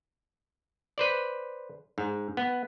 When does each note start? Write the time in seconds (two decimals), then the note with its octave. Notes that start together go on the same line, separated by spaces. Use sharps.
0.98 B4 C5 D5
1.98 G#2
2.37 B3